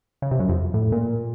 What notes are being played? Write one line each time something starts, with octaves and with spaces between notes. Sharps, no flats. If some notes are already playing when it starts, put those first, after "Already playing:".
C#3
C3
F#2
F2
A2
A#2